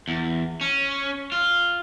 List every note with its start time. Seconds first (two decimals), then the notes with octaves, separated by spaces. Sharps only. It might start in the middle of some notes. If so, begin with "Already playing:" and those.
0.08 E2
0.61 C#4
1.32 F4